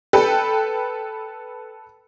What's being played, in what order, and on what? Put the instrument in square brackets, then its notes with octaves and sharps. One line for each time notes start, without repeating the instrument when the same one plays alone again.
[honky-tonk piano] A4 B4 G5